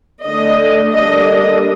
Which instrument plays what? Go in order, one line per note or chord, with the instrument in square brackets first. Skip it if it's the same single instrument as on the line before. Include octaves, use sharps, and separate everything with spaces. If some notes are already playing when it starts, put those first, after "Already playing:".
[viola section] D3 A3 D4 D#5
D3 G3 A#3 D4 D#5